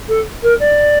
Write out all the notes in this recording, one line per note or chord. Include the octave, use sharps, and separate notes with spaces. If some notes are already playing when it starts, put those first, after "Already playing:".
A4
A#4
D5